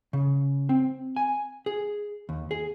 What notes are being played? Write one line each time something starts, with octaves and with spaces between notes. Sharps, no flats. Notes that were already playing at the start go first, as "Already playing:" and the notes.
C#3
C4
G#5
G#4
D#2
G#4